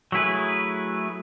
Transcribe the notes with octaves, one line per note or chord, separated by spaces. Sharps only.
F#3 A3 E4 G#4 B4